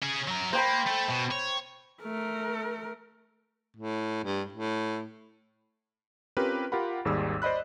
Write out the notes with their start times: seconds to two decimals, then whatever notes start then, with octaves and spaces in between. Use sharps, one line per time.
0.03 C#4 G#4
0.28 F#3 A#4
0.53 A#3 C5 G5 B5
0.86 A3 A4
1.09 B2
1.31 C#5
2.03 A3 A#4
3.77 A2
4.24 G2
4.53 A2
6.37 C4 C#4 F4 G4 A#4 B4
6.72 F4 G4 A#4 F#5 B5
7.05 G#1 D#2 G#2 G3 G#4 E6
7.42 C5 D5 D#5 B5 F#6